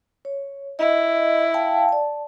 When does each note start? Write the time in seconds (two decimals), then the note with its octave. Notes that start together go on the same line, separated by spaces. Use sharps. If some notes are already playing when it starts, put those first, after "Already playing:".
0.25 C#5
0.79 E4 D#5
1.54 F5 G5 A5
1.89 D5 A5